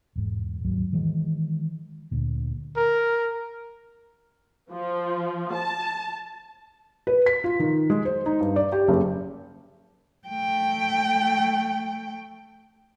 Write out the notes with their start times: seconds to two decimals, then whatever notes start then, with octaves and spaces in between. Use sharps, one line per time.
0.16 E1 G#2
0.65 D#2 G#2 F#3
0.93 D#3 E3 G#3
2.11 D2 A#2
2.76 A#4
4.71 F3
5.53 A5
7.07 B4
7.26 B6
7.44 F4
7.59 D#3
7.90 G#3
8.05 C5
8.26 D#4
8.40 G2
8.56 D5
8.72 G4
8.88 F#1
10.28 A3 G5